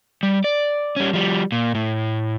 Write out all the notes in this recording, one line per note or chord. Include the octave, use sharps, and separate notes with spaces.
G3
D5
G3 C#4
F3 G3
A#2
A2